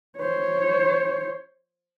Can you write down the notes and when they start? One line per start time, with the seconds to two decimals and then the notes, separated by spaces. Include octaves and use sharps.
0.18 C5 C#5